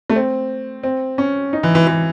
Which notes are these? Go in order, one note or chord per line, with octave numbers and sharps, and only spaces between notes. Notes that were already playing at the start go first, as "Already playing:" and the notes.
A3
C4
C4
C#4
D#4
E3
E3
E3